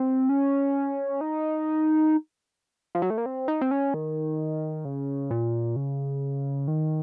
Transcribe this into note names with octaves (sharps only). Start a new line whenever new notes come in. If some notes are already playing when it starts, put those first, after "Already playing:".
Already playing: C4
C#4
D#4
F3
F#3
A3
A#3
C4
D#4
C4
C#4
D#3
C#3
A#2
C#3
D#3